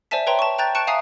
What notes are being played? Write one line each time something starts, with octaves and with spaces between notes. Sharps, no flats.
C5 D5 E5 G#5 A5 B6
B4 C#5 E5 G5 A#5 C6
A5 C#6
G5 A#5 F#6 G6 A6
A5 C#6 F#6 C#7 D7 E7
E5 F5 G#5 A#5 D#6 C7